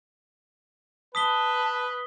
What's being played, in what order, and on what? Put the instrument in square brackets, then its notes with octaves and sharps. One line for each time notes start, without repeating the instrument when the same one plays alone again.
[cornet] B4 [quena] A5 [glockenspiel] D#6 B6 G7